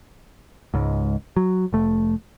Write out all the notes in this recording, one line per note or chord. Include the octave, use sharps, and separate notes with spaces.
C#2 G#2
F#3
F1 A3